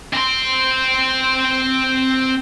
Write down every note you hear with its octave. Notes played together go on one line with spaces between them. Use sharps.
C4 C6